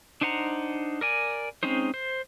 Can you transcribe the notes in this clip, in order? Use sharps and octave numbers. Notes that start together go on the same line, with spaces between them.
D4 D#4 C5 F#5 A#5
A#4 D5 G#5
G#3 C4 C#4 D#4 C5
C5